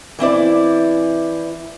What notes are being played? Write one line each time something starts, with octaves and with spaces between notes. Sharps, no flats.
E3 C4 E4 D5